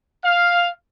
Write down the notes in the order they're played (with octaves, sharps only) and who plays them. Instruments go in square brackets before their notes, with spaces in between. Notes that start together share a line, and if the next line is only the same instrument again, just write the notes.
[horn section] F5